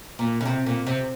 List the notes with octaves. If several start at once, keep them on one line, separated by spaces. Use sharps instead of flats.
A#2
C#3
C3
A#2
C3